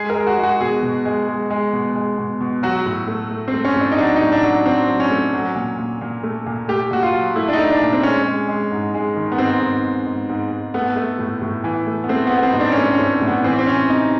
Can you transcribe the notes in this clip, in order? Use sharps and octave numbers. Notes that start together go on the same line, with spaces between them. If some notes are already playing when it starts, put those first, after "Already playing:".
Already playing: G#3 G#4
A#4
G#3
F#4
G#3
F#4
B2 G#4
B2
G#3
G#3
G#3
B2
G#3
B2
B2
F#3 F#4
A2
A3
A3
C4
A3
C#4
A2
D4
D#4
F#3 D4
D#4
A2
D4
F#3
F#3 C4
F#3
C#4
A3
F#3
A#2
A#2
A#2
A3
A#2
A3 G4
A#2 F#4
F4
F#3
A3 E4
D4
D#4
A3
D4
A#2
C4
G#3 C#4
G#3
G#3
G#2
G#3
D#3
B3
G#2 C4
G#2
G#2
G#2
G#2
G#2
A3 B3
A3
A2
A2
E3
A3
B3
A3 C4
B3
A3
B3
C4
A2 D#4
D4
C#4
A3 C4
A2 C#4
A2
B3
E3 C4
C4
C3 C#4
C3 D#4